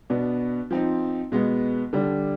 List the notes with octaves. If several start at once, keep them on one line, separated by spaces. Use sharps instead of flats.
B2 B3 D4
F3 C4 D#4
B2 G#3 B3
D3 G3 D4